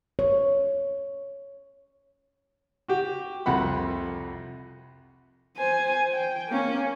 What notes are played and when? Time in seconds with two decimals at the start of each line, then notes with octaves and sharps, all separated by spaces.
0.19 C#5
2.88 F#4 G4
3.46 C2 F2 F#5 B5
5.57 C5 G#5
6.12 G5
6.48 A#3 C#4